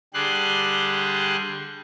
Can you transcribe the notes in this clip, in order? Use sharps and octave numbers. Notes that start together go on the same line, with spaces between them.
D3 G3 G4 G#4 C6 F#6